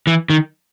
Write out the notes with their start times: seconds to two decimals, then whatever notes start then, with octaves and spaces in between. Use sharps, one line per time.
0.07 E3
0.30 D#3